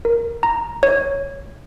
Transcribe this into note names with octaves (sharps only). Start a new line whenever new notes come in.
A#4
A#5
C#5